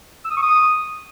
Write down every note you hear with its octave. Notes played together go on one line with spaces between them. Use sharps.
E6
D#6
C#6
D#6